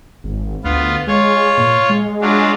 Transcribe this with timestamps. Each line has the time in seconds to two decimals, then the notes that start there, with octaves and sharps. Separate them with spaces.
0.24 G#1
0.64 D2 B3 F4
1.07 G#3 F4 C#5
1.58 A#2
1.89 G#3
2.21 F#3 D4 F4